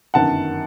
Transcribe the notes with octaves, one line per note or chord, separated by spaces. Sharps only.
G1 F#2 D#3 F#5 A5